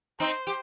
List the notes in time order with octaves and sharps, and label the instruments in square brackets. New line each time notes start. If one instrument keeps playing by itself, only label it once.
[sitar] C4 D#4 [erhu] C5
[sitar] G4